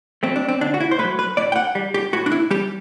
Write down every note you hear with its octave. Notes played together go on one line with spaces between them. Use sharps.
F#3 A3 C4
D4
C4
D3 D4
F#4
E4
C5
A3 B4
F#3
B4
A2 D5
G5
F#5
G3
G4
A2 F#4
D4
E4
G3 G4